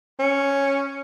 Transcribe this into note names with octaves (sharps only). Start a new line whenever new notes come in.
C#4